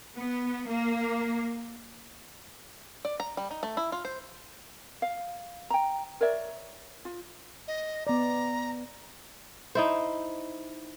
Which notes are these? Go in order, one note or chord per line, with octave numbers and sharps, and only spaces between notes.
B3
A#3
D5
A#5
G3
D#4
A3
E4
F4
C5
F5
G5 A#5
A#4 C#5 D5 E5
F4
D#5
B3 D5 A#5
D#4 E4 C5